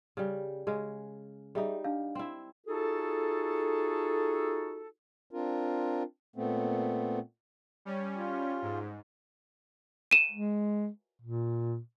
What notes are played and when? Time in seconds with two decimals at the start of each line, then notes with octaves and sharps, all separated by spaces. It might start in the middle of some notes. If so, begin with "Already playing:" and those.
0.17 C#3 G3
0.67 C#3 G#3
1.55 G3 D#4 G#4 E5
1.84 D4 F5
2.15 C4 E4
2.67 D#4 F4 F#4 G#4 A4
5.31 C4 D4 F4 A#4
6.36 A#2 A3 B3 C4
7.85 G3 C#4
8.16 F4
8.62 G#2
10.11 D#7 E7
10.31 G#3
11.22 A#2